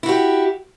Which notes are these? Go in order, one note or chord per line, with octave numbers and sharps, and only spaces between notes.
E4 F#4 G4